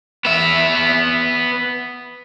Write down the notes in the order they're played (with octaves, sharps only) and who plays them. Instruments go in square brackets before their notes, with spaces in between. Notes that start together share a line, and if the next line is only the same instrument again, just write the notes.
[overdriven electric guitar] B3 E5